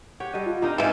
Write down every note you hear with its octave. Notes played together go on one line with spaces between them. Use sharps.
G4 C#5 F#5
G3 A4 D#5
F4
C4 D4 D#4 G4 A#4 D#5 A#5
G#2 C#3 E3 E5 A6